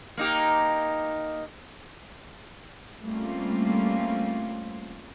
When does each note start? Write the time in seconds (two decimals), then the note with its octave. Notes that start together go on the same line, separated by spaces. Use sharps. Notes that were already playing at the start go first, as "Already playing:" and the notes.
0.17 A#3 D#4 G4
3.02 G3 A3 A#3 C4 C#4 F4